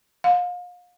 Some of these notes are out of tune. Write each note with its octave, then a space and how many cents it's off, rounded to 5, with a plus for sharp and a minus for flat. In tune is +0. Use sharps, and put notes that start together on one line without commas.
F5 +35